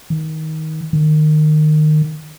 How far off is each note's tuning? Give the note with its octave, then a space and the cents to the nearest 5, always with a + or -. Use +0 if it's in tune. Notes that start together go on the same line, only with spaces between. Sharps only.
D#3 +20
D#3 -25